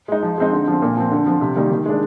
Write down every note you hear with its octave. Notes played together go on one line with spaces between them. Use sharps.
G#3 D#4
F3
G#3 C4 D#4
D3
F3 C4
A#2
F3 C4
D3
F3 C4
C3
D#3 G3 A#3
D#3
G#3 D4